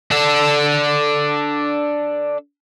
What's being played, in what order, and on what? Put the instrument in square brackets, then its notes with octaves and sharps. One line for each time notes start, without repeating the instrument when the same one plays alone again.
[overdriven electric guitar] D4 A4